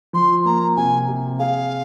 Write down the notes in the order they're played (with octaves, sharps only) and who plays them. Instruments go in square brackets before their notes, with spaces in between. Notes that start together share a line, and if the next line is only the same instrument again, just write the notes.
[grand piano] F3 [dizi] C6
[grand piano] A#3 [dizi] A#5
[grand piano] C3 [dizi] G#5
[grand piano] C3
[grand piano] G#4 [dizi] F5